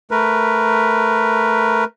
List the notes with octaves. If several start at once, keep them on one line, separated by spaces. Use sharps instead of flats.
A3 A#4 B4